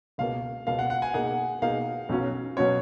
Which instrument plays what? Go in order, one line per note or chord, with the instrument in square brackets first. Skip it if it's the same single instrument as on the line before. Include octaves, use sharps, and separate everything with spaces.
[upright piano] C#2 B2 A#3 [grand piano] F5
[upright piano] C#2 B2 A#3 [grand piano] F5
[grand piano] F#5
F#5
G#5
[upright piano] B2 A#3 D#4 G#4 [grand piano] F#5
[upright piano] B2 A#3 D#4 G#4 [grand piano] F5
[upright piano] B1 B2 F#3 C#4 F#4
[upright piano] B2 F#3 C#4 F#4 [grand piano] C#5